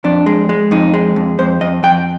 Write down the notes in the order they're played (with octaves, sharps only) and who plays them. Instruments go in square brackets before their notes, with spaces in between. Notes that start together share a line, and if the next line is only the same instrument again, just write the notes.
[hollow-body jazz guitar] F2 D4
G#3
G#3
F2 D#4
G#3
F2
F2 C5
F2 D#5
F2 G5